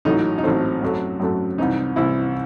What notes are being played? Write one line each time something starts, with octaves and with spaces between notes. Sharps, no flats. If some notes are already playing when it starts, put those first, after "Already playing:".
A1 A2 F#3 A3 D#4
D#4
A1 A2 F#3 A3 C4
F#2 F#3 A3
F#2 F#3 A3
C2 C3 E3 D#4
C2 C3 E3 E4